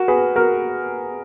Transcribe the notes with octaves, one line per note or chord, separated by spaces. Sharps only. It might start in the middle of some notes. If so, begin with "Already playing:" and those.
Already playing: F#4 A#4
G#4 B4
F#4 A#4